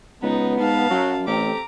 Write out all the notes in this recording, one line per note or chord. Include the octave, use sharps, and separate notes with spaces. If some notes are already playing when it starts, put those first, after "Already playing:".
C#2 B3 D#4
G#2 F5 A5
F#2 F#3
A1 C4 G4 A4 A#5 D6